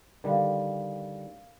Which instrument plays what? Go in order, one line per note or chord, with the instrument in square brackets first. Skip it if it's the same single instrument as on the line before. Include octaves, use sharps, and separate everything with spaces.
[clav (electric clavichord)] D3 D#3 G3 [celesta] A#4 F5